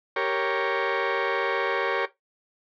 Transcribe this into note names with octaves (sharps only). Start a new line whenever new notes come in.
G4 A#4 C#5